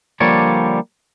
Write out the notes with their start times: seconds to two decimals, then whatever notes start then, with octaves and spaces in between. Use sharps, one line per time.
0.20 D3 F3 G3 A#3 C#5 D5